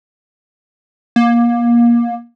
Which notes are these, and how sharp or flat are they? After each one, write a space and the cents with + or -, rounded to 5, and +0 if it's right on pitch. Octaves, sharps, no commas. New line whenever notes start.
A#3 +25